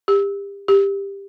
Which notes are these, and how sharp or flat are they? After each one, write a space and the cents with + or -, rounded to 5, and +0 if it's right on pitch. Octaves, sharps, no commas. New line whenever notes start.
G4 +30
G4 +15